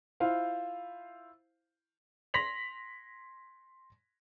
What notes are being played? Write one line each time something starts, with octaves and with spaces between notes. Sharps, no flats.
E4 F4 C5 F5
C6 A#6 B6 F7 F#7